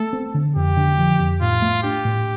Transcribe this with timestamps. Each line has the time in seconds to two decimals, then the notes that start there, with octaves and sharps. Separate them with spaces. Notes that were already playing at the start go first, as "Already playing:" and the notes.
Already playing: A3 A4
0.13 C4
0.34 D3
0.56 F2 G4
0.77 D3
0.98 F3
1.19 F2
1.41 A2 F4
1.62 A3
1.83 D4 G4
2.05 A2